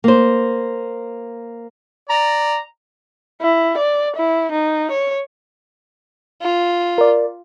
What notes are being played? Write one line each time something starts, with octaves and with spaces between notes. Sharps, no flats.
A#3 C5
D5 A#5
E4
D5
E4
D#4
C#5
F4
A#4 D5